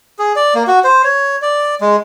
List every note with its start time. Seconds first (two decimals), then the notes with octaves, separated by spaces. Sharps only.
0.19 G#4
0.36 D5
0.55 A#3
0.68 F#4
0.84 C5
1.04 C#5
1.42 D5
1.81 G#3